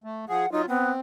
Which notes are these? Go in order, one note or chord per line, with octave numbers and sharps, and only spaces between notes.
A3
F3 G#4 F#5
F#3 D#4 F4
B3 C4